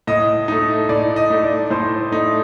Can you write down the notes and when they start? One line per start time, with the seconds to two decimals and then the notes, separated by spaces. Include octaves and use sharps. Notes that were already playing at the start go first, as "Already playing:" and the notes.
0.07 A2 D#5
0.48 A3 D#4
0.89 A2 D5
1.16 D#5
1.30 A3 D#4
1.44 D5
1.70 A2 C5
2.11 A3 D#4